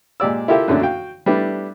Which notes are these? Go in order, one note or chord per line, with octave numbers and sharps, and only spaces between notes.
A#2 G#3 G4 D5 E6
E4 F4 G4 A4 A#4 E5
F#2 A#2 D3 A3 C#4 D4
F#4 F5 G5
G3 A3 B3 D4 E4